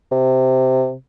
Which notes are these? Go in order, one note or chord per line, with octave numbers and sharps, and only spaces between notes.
C3